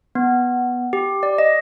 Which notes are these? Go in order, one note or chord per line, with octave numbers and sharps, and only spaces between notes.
B3
G4
D5
D#5